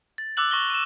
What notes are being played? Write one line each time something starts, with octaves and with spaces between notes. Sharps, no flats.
A6
D6 E6 F#6 F#7
C#6 A#6 G7
D#7 E7